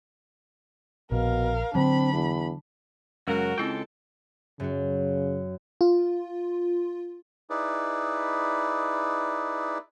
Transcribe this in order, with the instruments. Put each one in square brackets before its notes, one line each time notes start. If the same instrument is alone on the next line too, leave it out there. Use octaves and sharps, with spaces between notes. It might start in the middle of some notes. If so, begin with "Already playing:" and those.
[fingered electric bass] A#1 [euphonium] B2 [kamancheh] A#4 F5
[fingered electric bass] D3 F#3 [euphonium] C4 [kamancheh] D4 B5
[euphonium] E2
[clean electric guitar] F#2 C#3 [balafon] G#3 [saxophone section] F#4 A#4
[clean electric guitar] C#2 G#3 G5 [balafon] C4 E4 F4 [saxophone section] A4
[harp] F#2 F#4 [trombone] C#3
[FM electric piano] F4
[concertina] D#4 E4 G#4 B4 D5